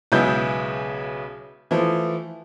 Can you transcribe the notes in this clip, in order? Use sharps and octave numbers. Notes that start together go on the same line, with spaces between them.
B1 C#3 G#3 B3 E4 G6
E3 F3 A3